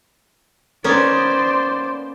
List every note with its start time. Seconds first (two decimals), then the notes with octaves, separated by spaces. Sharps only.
0.84 A#3 B3 C#4 C5 D5